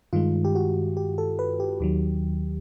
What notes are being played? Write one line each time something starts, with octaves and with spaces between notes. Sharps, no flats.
G2 D#3 G#3 F4
G4
F#4
G4
A4
B4
G4
D#2 D#3 F#3